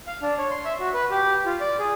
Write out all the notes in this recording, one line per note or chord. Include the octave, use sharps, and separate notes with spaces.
F5
D4
C#5
C6
E5
F#4
B4
G4
F4
D5
G#4